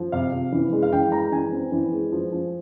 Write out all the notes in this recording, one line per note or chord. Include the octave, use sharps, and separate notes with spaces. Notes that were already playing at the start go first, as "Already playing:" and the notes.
Already playing: F3
C3 F5
C3
E3
G#3
F5
E3 G5
G#3 A#5
E3 G#5
C4
E3
G#3
F3
F3